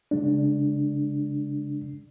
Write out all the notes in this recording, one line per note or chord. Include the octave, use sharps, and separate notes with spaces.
C#3 G#3 D4